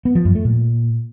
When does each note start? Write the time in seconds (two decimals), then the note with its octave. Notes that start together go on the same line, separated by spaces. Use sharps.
0.05 B3
0.15 F3
0.25 F#2
0.35 A3
0.45 A#2